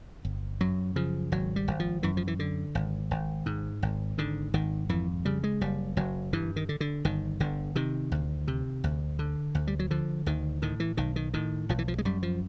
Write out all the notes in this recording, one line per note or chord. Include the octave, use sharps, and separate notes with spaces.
G1
F#2 F#3
C#3 F3
G#1 F#3
G3
G#1
F3
F#2 E3
F3
E3
D3
G#1
G#1
G#2
G#1
G#2 D3
G#1 D#3
F2 E3
C#3 G3
G#3
F#1 G3
F#1 F#3
G2 E3
D#3
D3
D3
G1 D#3
G1 D3
C3 D#3
D2
C3
D2
D3
D2
G3
F#3
D3 F3
D2 D#3
A2 D#3
E3
B1 D#3
D#3
A2 D#3
B1 F3
E3
F3
G#3
F#2 G3
F3